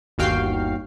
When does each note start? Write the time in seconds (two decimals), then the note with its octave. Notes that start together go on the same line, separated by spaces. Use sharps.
0.18 G1 D#2 F#4 F5 G5 C7